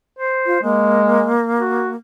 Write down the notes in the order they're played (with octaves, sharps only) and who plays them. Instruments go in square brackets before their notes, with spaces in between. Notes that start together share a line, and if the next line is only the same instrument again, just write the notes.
[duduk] C5
[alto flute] F4
[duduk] G#3 [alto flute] A#3
[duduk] F#4